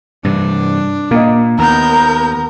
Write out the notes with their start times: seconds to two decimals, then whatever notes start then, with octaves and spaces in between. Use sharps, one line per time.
0.24 G2 C3 E3 D4
1.11 A#2 A#3 D#5
1.58 D#2 B3 A#4 G6